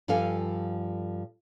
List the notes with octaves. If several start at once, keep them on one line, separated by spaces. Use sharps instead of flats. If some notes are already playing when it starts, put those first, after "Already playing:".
G2 F3 G3 A4 F5 G#5